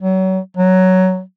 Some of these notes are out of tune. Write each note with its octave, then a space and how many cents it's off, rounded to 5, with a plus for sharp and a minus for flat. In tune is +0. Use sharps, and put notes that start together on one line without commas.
F#3 +30
F#3 +10